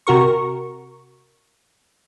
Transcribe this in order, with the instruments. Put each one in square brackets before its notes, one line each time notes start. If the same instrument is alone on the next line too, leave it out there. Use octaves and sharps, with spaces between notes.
[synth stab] C3 F#4 A#4 C#6